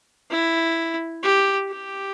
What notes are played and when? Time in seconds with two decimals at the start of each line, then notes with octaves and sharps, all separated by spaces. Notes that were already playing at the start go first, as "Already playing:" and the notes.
0.30 E4
1.23 G4
1.69 G4